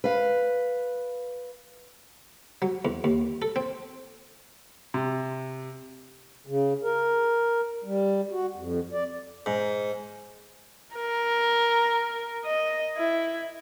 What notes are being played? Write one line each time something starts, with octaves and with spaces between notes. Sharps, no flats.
B4 F5
F#3
E2
D#2
A4
C4
C3
C#3
A#4
G3
F#4
F2
D5
G#2
A#4
D#5
E4